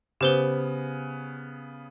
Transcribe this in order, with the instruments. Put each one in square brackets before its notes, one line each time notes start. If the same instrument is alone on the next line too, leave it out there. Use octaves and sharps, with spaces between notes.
[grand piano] C#3 B3 [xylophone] G4 C5 G7